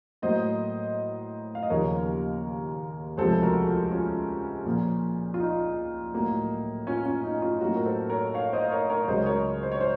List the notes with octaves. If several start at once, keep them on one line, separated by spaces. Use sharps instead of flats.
A2 F#3 A#3 C5 D#5
F5
D#5
D#2 C#3 F3 A#3 A#4 C#5
C#2 C3 F3 A3 A4 C5
F#4 A#4
F4 A4
C#4 F4
A#2 F3 A#3
F4
D#4
A2 F#3 A#3
C#4 F4
C#4
D#4
C#4 F4
A2 F#3 A#3 D#4 F#4
A#4
A4 C5
A#4 C#5
C#5 F5
C5 D#5
A#4 C#5
A#4 C#5
C#5
C#2 C#3 F#3 C5 D#5
A#4 C#5
C5
C#5
C5